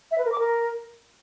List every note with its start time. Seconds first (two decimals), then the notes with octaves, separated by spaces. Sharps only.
0.11 E5
0.18 B4
0.25 A#4
0.32 D6
0.39 A#4